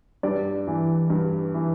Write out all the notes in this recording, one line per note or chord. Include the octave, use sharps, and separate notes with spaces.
G2 D5
E3
G2
E3